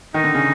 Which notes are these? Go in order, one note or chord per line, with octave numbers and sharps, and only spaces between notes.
D#3 D#4
D3
C#3